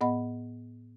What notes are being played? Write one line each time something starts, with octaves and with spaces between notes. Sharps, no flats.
A2 B3 D#5 F#5 B5